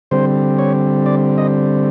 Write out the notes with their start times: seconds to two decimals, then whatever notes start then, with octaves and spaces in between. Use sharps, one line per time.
0.11 D3 G3 C4 C5
0.59 C#5
1.06 D5
1.38 D#5